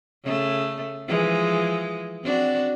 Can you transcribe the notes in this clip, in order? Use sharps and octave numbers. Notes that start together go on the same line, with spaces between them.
C#3 A3
E3 F3 G#3
C4 D4 F#4